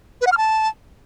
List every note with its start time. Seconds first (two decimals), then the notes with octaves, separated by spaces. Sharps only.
0.21 B4
0.27 F#5
0.32 F6
0.37 A5